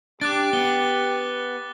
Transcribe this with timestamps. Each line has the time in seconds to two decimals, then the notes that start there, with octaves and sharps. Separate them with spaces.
0.21 D4 G4 D6 F#6 A6
0.53 B3 G7